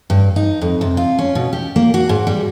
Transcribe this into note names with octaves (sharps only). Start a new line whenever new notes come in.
G2
D#4
F2
C3
F4
C#4
B2
G4
A#3
F#4
G#2
G3